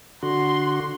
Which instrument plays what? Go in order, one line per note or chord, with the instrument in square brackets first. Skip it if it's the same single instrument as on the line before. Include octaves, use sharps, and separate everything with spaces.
[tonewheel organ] D3 F#4 [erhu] C6